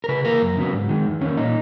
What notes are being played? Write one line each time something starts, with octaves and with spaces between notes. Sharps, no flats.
A#4
C#3 B4
E3 A#3 A#4
F#2
C#3 F#3 B3
G#2
D#3 G#3
E2
D#3 A#3 C#4
A#2 D#4